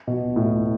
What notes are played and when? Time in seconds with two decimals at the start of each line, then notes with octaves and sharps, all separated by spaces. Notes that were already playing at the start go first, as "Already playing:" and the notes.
0.07 B2
0.36 A2